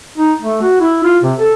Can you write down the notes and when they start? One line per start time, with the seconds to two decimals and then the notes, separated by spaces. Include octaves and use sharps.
0.18 D#4
0.42 A3
0.62 F#4
0.80 E4
1.04 F4
1.23 C3
1.39 A4